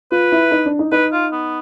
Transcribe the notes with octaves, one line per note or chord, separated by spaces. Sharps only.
F4 B4
E4
D#4
D4
D#4
D#4 B4
F4
B3